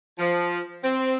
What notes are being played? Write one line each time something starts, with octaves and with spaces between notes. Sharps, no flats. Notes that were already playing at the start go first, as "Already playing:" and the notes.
F3
C4